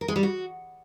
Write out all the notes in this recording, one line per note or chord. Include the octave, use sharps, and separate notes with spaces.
A#4
G#3
G3
F#4